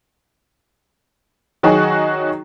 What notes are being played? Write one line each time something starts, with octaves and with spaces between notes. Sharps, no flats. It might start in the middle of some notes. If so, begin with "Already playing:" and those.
D#3 F#3 D#4 F#4 G#4